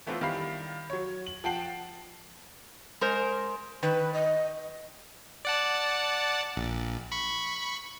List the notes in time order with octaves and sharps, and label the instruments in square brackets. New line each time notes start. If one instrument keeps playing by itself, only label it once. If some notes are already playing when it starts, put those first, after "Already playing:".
[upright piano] E3 A3 B3 C4 E4 F4
D#3 G3 E4 F5 B5 C7
F#3 C#5
F#7
F3 F#5 G5 A5 C7 F#7
[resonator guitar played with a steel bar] G#3 A#4 C5
[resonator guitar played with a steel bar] D#3 [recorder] B4
[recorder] D#5
[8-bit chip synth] D5 F#5 A5
A#1
B5 C#6